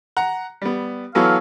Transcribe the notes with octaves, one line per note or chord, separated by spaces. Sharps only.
F#5 A#5
G3 B3
E3 F#3 B3 A4 C#5 F5